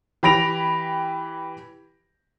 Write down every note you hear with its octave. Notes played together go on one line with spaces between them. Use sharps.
E3 G4 B5 A#6 D7 F7